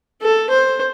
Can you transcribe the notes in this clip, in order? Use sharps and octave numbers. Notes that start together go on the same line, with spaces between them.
A4
C5